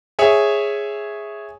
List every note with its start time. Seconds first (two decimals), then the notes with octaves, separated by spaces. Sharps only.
0.19 G#4 C#5 E5 G#5